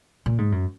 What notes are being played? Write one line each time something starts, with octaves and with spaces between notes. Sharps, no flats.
A#2
G#2
F#2